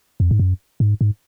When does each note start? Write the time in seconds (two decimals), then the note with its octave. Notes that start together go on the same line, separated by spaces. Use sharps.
0.20 F2
0.31 G#2
0.40 F#2
0.80 G#2
1.01 G#2